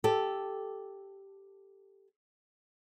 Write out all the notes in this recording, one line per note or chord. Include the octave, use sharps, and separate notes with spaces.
G4 A4